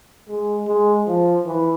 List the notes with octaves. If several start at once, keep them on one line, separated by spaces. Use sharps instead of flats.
G#3
G#3
F3
E3